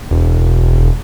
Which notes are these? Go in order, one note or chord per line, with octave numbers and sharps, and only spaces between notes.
E1